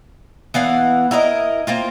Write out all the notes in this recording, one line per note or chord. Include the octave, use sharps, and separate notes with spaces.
E3 B3 F5 F#5
E4 A#4 C#5 D#5
A#3 C4 F4